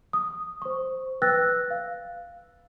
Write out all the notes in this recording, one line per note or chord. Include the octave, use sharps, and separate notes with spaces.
D#6
C5 C#6
B4 G5 E6 F#6 A6 A#6
F5